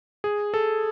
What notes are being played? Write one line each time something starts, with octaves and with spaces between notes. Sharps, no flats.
G#4
A4